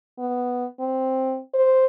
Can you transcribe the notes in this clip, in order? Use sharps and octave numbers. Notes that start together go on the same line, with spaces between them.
B3
C4
C5